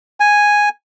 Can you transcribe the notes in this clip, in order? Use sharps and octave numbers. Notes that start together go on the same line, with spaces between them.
G#5